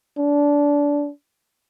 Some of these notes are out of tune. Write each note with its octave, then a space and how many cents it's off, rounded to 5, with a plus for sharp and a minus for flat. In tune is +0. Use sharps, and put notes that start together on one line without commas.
D4 -20